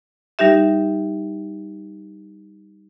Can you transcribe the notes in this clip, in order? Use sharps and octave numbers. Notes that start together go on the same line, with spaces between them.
G3 D#4 G4 E5